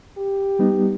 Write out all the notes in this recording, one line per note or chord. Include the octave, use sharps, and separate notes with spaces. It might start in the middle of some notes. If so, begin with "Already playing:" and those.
G4
G3 B3 D#4